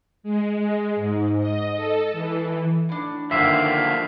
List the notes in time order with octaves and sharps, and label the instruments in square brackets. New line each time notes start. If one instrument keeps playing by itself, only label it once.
[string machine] G#3
G#3
G#2
D#5
A4
E3
[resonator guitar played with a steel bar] A2 D4
[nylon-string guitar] D3 D#3 [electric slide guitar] F3 G3 A#3 [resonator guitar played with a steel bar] E5 [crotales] B6 C7